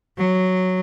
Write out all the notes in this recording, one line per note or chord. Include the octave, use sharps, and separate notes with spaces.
F#3